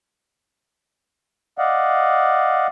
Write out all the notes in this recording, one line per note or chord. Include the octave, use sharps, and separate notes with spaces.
D5 D#5 F5 F#5